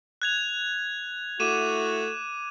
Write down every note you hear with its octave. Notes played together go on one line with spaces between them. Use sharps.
F#6 G#6 F7
A3 E4 F#4 D6 D#7 E7